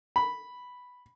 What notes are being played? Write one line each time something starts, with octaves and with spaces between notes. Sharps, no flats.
B5